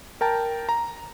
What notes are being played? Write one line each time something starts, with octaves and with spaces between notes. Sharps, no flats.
A#4 G5 A5 A#5
A#5